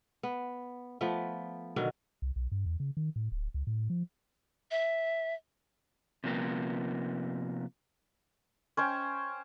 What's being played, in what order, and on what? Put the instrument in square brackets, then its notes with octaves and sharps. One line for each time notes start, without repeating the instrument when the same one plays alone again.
[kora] B3
F3 A3 B3
B2 D3 D#3 F#3
[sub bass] C2
B1
G2
E2
C#3
D#3
A2
D1
C#2
A2
F3
[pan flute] E5
[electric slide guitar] C3 F3 A#3 B3
[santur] C#4 C5 G5